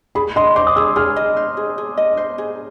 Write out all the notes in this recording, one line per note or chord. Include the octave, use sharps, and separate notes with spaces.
G#4 B5
D#5 C6
C5 D6
D#6
G#4 E6
G#4 F6
D#5
C5
G#4
G#4
D#5
C5
G#4